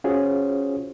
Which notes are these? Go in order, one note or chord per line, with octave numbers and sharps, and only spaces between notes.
C#4 F4 F#4 G#4 C5 C#5